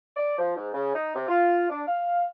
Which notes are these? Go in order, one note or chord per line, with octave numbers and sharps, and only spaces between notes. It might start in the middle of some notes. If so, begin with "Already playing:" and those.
D5
F3
G#2
C#3
D#4
C3
F4
D4
F5